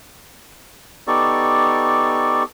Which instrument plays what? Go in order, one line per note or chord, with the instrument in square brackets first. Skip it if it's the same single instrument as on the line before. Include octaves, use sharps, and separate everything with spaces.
[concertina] B3 D#4 G4 A4 D5 C#6